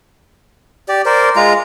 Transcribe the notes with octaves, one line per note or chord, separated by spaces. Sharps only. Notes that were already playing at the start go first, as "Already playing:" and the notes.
G4 D5
A#4 C5 D5
G#3 F4 A#5